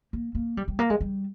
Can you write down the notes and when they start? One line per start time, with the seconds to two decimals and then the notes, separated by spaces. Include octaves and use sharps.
0.13 A#3
0.35 A#3
0.57 G3
0.68 G3
0.79 A#3
0.90 G#3
1.01 G3